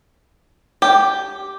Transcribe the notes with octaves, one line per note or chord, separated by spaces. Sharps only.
G4